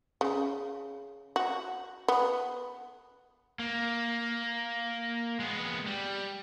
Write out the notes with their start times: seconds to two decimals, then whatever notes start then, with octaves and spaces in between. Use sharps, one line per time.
0.21 C#3
1.36 F#4
2.08 B3
3.59 A#3
5.40 G#3 B3
5.87 G3